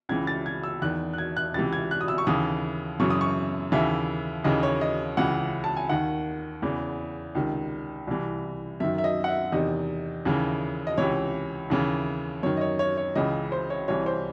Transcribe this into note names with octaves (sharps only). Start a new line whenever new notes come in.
C#2 C#3 E3 G#6
A6
G#6
E6
E2 D#3 F#6
F#6
G#6
F#6
C#2 C3 E3 A6
G#6
F#6
D#6
E6
C#6
D#2 C#3 E3 D#6
F#2 C#3 E3 C#6
D#6
C#6
D#2 C#3 E3 E5
D#2 C#3 E3 D#5
C#5
D#5
C#2 C#3 E3 F#5
A5
G#5
D#2 D#3 F#5
E2 C#3 E3
C#2 C3 D#3
C2 C3 E3
F#2 D#3 E5
E5
D#5
F#5
E5
E2 C3 D#3 D#5
D#2 C#3 E3
D#5
C#2 C3 E3 C#5
D#2 C#3 E3
F#2 D#3 C#5
D#5
C#5
C#5
C#5
C#2 C#3 E3 D#5
C5
C#5
C2 C3 E3 C#5
C5